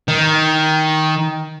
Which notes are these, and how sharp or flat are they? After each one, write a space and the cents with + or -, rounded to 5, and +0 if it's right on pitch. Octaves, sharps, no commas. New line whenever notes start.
D#3 +10